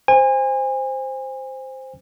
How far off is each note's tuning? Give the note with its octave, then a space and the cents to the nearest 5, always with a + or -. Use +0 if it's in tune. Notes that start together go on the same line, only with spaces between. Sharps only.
C5 +0 G#5 -30